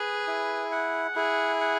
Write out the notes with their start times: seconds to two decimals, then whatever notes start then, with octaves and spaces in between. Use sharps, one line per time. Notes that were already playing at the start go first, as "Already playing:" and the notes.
Already playing: G#4 B4
0.27 E4
0.72 F#5
1.16 E4 G#4
1.61 F#5